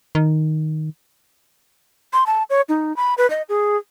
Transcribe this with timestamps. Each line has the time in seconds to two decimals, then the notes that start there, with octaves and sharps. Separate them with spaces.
0.15 D#3
2.13 C6
2.26 A5
2.50 C#5
2.69 D#4
2.96 B5
3.18 B4
3.30 D#5
3.49 G#4